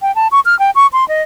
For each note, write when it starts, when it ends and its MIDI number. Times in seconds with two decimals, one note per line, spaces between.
0.02 0.14 79
0.15 0.28 81
0.31 0.40 85
0.45 0.58 89
0.59 0.70 79
0.75 0.87 85
0.93 1.07 84
1.08 1.22 75